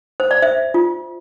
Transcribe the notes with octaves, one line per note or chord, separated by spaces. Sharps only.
C5
D5
C5 E5
F4